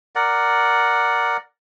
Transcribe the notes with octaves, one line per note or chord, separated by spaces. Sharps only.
A#4 D5 F#5